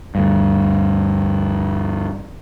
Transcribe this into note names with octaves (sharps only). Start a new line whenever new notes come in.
D2 G2